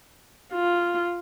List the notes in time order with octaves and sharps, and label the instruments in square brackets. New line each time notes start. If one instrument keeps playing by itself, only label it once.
[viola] F4